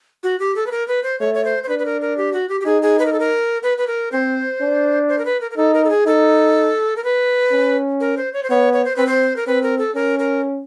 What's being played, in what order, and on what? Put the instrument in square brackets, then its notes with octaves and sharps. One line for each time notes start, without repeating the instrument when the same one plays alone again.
[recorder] F#4
G4
A4
B4
A#4
B4
C5
[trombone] A3 [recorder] C#5
[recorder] C#5
C5
C5
[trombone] D4 [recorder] B4
[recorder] B4
A#4
A#4
G4
F#4
G4
G4
[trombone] D#4 [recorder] G#4
[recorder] G#4
B4
A#4
A4
A#4
B4
B4
A#4
[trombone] C4 [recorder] C5
[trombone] D4
[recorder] C5
A#4
B4
A#4
A#4
[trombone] D#4 [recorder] A4
[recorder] A#4
A4
G#4
[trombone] D#4 [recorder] A4
[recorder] A#4
B4
[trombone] C#4
[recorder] A#4
C5
C#5
C5
[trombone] B3 [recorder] C#5
[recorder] C#5
C5
[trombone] C4 [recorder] B4
[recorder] C5
A#4
[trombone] C4 [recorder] B4
[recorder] A#4
A4
[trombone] C#4 [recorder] A#4
[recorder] A#4